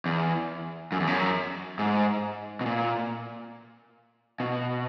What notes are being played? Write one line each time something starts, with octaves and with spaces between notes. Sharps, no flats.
E2
F#2
E2
F#2
G#2
B2
A#2
B2